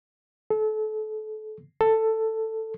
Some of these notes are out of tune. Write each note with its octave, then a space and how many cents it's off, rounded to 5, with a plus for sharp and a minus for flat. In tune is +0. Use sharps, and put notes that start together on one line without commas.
A4 -30
A4 +10